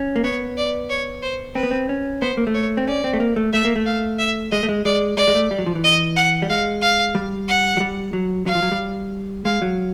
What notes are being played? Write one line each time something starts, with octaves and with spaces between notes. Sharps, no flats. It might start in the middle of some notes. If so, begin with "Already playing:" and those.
Already playing: C#4
A#3
B3 C#5
D5
C#5
C5
C4 B4
B3
C4
C#4
B3 C5
A#3
A3
C#5
C4
C#4 D5
C4
A3
A#3
A3
A3 E5
A#3
A3
F5
E5
G#3 D#5
A3
G#3
G#3 D5
G#3 D5
G#3
A3
G3
F#3
F3
E3
D#5
F#5
G3
G#3 F5
F5
G3
F#5
F#3
G3
F#3
F#3 F5
F3
F#3
G3
G#3 F5
F#3